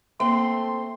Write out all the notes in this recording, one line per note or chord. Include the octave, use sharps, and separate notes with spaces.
A3 A#3 C4 C6